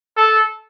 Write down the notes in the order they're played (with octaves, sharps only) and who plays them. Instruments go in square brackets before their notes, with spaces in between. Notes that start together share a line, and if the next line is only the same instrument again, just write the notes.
[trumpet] A4